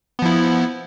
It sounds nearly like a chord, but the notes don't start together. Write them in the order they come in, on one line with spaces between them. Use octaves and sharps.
B3 F3 E4